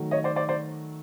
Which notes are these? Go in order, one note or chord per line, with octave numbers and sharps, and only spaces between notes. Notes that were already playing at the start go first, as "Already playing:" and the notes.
Already playing: D#3 F#3 A3
C#5 D#5
C5 D5
C5 D5
C5 D5